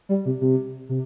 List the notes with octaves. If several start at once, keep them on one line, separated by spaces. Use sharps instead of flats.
G3
C3
C3
C3